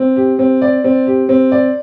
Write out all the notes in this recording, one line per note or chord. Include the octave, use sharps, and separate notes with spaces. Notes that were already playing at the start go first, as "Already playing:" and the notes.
Already playing: C4
G4
C4
D5
C4
G4
C4
D5